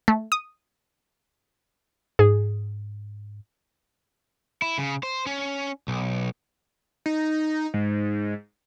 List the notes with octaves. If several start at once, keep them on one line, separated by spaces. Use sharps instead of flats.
A3
D#6
G#2 G#4
E4
C#3
C5
C#4
B1
D#4
G#2